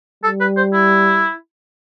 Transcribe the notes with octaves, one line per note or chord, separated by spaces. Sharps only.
G3 A4
B4
C5
E4